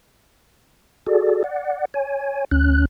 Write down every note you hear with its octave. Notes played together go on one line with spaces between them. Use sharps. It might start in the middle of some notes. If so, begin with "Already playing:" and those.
F#4 G#4 A4 D5
D5 F#5
C#5 G#5
D2 C#4 F#6